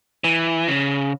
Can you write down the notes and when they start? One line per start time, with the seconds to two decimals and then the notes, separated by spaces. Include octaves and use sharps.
0.24 E3
0.68 C#3